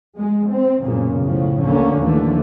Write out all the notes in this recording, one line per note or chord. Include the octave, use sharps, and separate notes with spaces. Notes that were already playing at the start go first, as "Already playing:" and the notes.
G#3
C4
B1 F#2 A#2 C#3
A2 C#3 F3
D2 D3 A#3 C#4
D#2 A2 D3 E3 F3 A3